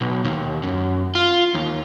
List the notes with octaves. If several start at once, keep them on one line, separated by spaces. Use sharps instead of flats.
B1
D#2
F#2
F4
D#2